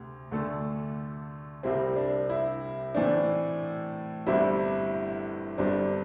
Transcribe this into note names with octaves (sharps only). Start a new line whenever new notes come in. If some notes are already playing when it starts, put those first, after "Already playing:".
Already playing: D2 C3
D2 D3 A3 D4 A4
C2 C3 G3 C4 E4
D4
E4
A2 E3 A3 C4 D4
G1 G2 G3 C4 E4
G1 G2 G3 C4 D4